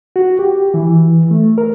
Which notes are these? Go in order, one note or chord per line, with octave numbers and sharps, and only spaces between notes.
F#4
G4
E3
A3
A#4